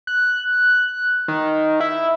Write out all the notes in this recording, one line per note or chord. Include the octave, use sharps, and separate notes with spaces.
F#6
D#3
E4